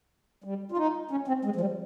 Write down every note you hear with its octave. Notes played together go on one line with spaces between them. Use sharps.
G3
F4
D#4
C#4
C4
G#3
F3
G3